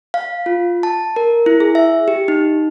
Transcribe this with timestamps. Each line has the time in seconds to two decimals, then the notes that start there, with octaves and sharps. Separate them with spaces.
0.14 F5
0.46 F4
0.83 A5
1.16 A#4
1.46 E4
1.60 G#4
1.75 E5
2.08 G4
2.28 D#4